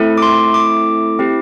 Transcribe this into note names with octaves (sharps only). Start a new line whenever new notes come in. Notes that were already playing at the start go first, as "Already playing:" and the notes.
Already playing: A3 C4 E4 A4
D6
C6
D6
C4 E4 G4